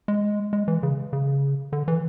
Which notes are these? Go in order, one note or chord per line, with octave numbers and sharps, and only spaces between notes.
G#3
G#3
E3
C#3
C#3
D3
E3